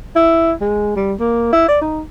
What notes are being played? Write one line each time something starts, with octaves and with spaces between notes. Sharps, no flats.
E4
G#3
G3
A#3
E4
D5
D#4